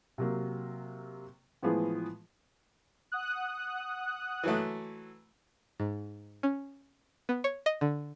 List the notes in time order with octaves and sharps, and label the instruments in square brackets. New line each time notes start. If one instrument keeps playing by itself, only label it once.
[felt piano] C3 F#3 A#3
A2 E3 F3 G#3 B3 G#4
[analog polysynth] F#5 D#6 F#6
[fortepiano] E3 F#3 A3
[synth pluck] G#2
C#4
B3
C#5
D#5
D3